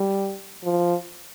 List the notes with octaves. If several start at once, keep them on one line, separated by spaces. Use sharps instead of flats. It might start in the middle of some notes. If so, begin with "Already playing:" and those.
Already playing: G3
F3